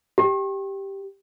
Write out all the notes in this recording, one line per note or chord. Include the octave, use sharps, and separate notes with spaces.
G4